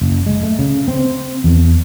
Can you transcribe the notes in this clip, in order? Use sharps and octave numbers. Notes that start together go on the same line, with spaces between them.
F#1
G#3
A3
C#3
C4
E2